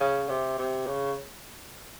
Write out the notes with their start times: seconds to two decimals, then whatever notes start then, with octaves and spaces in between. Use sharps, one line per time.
0.01 C#3
0.29 C3
0.58 C3
0.87 C#3